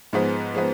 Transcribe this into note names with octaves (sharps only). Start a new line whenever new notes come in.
G#2 F3 G#3 B3
F3 G#3 B3